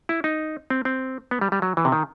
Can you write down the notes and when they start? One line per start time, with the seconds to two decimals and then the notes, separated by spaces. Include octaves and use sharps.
0.09 E4
0.24 D#4
0.70 C4
0.85 C4
1.31 B3
1.41 G3
1.52 G3
1.62 F#3
1.77 E3
1.85 C3
1.92 D#3